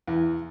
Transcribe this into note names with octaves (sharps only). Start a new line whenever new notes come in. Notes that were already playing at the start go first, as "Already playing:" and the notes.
E2